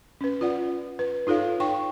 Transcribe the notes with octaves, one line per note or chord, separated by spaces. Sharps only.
C#4 B4
F4 D5 F#5
B4
D#4 F4 A4 C#5 F5
D#4 C#5 G5 C#6